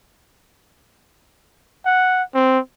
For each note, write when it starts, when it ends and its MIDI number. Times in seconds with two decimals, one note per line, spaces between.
1.86 2.23 78
2.35 2.59 60